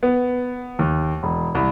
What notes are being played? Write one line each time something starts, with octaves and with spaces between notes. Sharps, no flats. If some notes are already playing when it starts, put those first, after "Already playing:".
B3
D#2
E1
C2